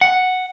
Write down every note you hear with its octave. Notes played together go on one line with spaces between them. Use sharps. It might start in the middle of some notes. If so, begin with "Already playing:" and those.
F#5